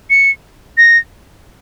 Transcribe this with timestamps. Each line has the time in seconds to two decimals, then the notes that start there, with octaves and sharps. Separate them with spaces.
0.10 C#7
0.78 A#6